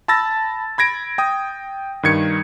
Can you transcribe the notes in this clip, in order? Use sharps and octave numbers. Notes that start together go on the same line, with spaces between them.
A5 B5 E6 A6 A#6
B5 G#6 A#6 D7
G5 D#6
G2 D#3 G#6 C#7